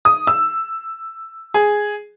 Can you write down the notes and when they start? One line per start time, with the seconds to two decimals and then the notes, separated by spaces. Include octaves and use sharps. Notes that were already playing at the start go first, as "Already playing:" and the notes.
0.05 D#6
0.27 E6
1.54 G#4